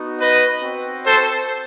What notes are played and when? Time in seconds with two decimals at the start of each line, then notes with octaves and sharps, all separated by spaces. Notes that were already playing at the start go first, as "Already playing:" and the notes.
Already playing: B3 D#4 F#4
0.19 B4 D#5
0.62 C4 F#4
1.04 A4 C5